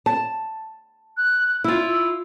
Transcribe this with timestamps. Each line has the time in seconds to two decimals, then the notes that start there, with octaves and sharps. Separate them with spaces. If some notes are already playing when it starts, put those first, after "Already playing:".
0.06 A5
1.17 F#6
1.64 E4 F4 E6